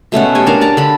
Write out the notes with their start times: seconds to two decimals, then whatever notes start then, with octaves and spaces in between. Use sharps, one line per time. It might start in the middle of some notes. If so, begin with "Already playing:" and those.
0.12 B2 A3 C#4 F#5
0.35 G4 G#5
0.47 D4 A#4 F5
0.61 D5 A5 A#5
0.77 D3 B5